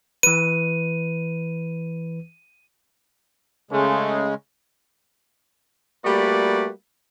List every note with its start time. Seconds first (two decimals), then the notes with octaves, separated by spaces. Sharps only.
0.23 E3 B4 D#7
3.71 C#3 G#3 A3 C#4 G#4
6.05 G3 A3 A#3 F#4 B4 D5